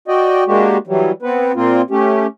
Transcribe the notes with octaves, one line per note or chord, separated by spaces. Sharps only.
F#4 D5 D#5 G5
G#3 A#3 D4 F#4 G4
E3 F#3 G3
B3 C4 B4
A#2 A#3 C4 F4
A3 C#4 G4